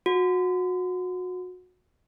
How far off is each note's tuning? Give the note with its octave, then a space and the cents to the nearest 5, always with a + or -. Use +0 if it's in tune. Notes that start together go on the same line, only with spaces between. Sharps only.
F#4 -25